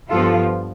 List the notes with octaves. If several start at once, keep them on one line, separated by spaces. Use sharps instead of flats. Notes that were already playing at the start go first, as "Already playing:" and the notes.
G2 F3 B3 F4 A4